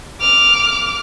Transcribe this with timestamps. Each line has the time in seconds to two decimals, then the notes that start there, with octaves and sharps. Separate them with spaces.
0.20 D6 F6